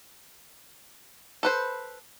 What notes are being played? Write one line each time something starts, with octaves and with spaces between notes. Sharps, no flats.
A4 B4 C5